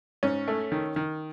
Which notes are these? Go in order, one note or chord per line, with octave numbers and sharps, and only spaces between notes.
G#2 C#4
A3
D#3
D#3